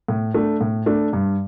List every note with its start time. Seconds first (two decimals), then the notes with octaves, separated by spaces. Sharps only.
0.08 A2
0.34 A3 D4
0.61 A2
0.86 A3 D4
1.13 G2